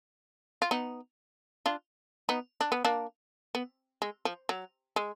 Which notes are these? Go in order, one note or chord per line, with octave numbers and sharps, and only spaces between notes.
F4
B3 D#4
D4 F4
B3 D#4
D4
B3
A#3 D4
B3
G#3
F3
F#3
G#3